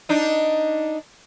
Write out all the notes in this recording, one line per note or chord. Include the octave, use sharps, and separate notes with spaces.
D4 D#4